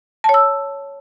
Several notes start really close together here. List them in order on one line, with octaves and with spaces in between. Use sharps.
A5 C#5 E6